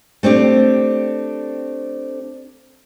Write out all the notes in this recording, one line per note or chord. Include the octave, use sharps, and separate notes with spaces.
A3 C4 D4 G4